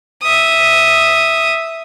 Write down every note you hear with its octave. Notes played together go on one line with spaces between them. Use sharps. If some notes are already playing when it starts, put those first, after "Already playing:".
E5 D#6